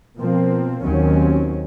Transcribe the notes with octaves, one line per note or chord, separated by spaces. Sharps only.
B2 F3 A#3 C4
D#2 D#3 F#3 C4 C#4